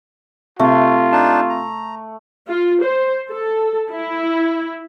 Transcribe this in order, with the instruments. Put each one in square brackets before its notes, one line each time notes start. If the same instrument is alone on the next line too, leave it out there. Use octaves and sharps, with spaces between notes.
[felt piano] C3 [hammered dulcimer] A3 [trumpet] F4
[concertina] D4 D#4 A5
A#5
[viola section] F4
C5
A4
E4